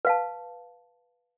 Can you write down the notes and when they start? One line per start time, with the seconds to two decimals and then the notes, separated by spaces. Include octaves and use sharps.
0.05 B4 F5 A5